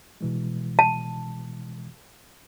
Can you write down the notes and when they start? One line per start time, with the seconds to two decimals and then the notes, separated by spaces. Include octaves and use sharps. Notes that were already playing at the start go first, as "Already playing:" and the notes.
0.21 B2 E3 G#3
0.79 A5